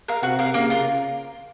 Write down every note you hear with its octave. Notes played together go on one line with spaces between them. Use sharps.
A#4 F5
C3 F#4
A#4 F5
C#3 A#3
F4 A#4